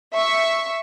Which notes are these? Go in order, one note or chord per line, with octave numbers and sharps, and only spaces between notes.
E5 C#6